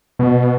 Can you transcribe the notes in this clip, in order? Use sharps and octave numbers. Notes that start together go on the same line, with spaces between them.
B2